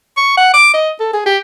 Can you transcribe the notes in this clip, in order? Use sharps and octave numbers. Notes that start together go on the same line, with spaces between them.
C#6
F#5
D6
D#5
A4
G#4
G4